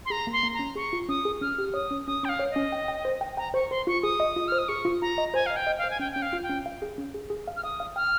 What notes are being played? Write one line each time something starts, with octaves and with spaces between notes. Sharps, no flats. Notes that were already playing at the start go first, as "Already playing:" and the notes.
C6
G#4 A#5
A#3
C6
A#3
A#5
C#4
G#4 C#6
F4
C#4 D#6
G#4
C#4 F6
G4
C#5 D#6
C#4
C#4 D#6
C#4 G5
F5
C#5
D#5
C#4
G5
G5
C5
G5
G5 A#5
C5 C#6
C5 C6
F4 C#6
G#4 D#6
D#5
F4
C5 F6
D#6
G#4 C#6
F4
F4 A#5
D#5
C5 G#5
D#5 F5
G5
D#5
F5
C5
G#5
C#4 G5
C#4 G5
F5
F4
G5
C#4
F5
G#4
C#4
G#4
G#4
F5
F6
F5 D#6
F5
G5 F6